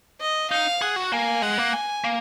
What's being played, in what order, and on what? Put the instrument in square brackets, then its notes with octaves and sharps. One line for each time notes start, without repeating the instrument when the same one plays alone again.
[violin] D#5
[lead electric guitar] D#4 [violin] F5
[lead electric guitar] G#4 [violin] F#5
[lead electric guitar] F#4
[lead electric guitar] A#3 [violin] G#5
[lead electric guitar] G#3 [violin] F#5
[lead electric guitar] A#3
[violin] G#5
[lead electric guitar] A#3